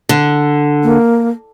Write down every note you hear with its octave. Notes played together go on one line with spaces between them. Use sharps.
D3
A#3